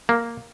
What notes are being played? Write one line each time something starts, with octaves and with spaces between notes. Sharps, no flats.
A#3